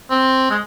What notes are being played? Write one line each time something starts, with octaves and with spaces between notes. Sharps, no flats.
C4
G#3